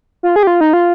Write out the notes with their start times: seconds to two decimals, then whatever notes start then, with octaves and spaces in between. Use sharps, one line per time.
0.23 F4
0.36 G#4
0.43 G4
0.47 F4
0.61 D#4
0.73 F4